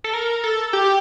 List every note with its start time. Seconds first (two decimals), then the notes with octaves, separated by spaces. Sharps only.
0.04 A4
0.13 A#4
0.44 A4
0.73 G4